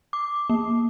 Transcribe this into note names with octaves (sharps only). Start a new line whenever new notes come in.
D6
A#3